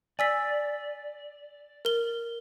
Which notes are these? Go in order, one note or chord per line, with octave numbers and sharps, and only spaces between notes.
D5 G#5 E6 B6
A#4 G7